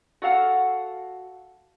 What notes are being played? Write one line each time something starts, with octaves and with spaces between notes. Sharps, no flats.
F#4 A4 F5 F#5